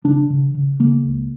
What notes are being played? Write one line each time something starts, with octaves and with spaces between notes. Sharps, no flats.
C#3 D4
C#3
C#3
C#3 A#3
C#2